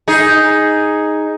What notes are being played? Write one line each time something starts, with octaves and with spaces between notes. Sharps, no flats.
D#4 G#4